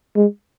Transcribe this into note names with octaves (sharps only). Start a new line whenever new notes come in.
G#3